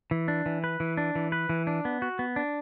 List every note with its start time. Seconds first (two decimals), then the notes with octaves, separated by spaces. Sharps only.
0.11 E3
0.28 D4
0.46 E3
0.64 B4
0.80 E3
0.97 D4
1.15 E3
1.32 B4
1.49 E3
1.67 D4
1.85 B3
2.02 F#4
2.19 B3
2.36 D4